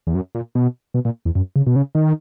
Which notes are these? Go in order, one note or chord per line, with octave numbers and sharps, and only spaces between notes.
E2
F#2
A#2
B2
B2
A#2
E2
F#2
C#3
B2
C#3
D#3